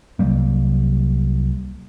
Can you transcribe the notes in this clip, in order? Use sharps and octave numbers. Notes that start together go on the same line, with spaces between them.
C2 F#3 G3 A#3